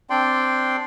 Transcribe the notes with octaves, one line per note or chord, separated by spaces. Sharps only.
C4 D4 D5 G5 C6